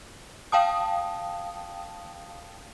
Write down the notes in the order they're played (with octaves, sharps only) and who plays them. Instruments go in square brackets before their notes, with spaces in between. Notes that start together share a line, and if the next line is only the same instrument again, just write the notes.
[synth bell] F5 G5 A5 D#6